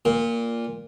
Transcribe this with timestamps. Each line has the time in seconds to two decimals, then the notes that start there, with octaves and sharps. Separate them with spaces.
0.05 A#2